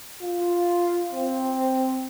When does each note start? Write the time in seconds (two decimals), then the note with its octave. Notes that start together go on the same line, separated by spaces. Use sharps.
0.22 F4
1.12 C4